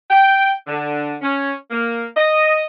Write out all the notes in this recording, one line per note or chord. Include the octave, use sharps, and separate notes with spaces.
G5
D3
C#4
A#3
D#5